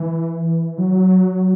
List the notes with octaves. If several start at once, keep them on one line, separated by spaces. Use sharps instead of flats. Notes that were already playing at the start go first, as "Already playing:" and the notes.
Already playing: E3
F#3